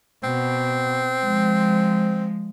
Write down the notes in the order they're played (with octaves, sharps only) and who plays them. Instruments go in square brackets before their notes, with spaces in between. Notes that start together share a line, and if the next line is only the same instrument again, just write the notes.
[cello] B2 [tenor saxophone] C4
[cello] F3 G#3